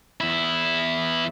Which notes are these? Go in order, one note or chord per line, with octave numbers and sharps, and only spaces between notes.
E2 E4